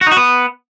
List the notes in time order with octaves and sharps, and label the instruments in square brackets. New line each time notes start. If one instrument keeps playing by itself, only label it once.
[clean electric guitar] F#4
D#4
F#4
B3